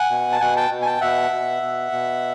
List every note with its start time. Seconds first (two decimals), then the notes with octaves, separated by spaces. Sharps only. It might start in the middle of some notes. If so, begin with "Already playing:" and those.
Already playing: F#5 G#5
0.10 B2
0.32 A5
0.40 B2 F#5 G#5
0.57 G5 A5
0.71 B2
0.82 G#5
0.86 G5 A5
1.01 B2 E5 F#5
1.31 B2
1.62 B2
1.92 B2